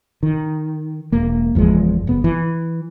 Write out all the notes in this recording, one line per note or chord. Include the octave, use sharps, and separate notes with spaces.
D#3
E1 A#3
F#1 E2 F3 G#3
F#1 B3
E3